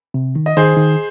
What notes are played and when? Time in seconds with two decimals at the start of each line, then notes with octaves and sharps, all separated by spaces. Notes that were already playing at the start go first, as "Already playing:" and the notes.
0.14 C3
0.36 D#3
0.46 D#5
0.57 D#3 G#4 C5
0.77 D#3